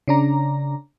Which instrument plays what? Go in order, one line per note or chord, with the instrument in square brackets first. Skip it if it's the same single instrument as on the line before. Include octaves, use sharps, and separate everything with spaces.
[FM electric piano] C#3 D4 A#5